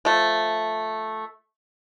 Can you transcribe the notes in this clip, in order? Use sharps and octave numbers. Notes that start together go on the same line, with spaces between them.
F3 A3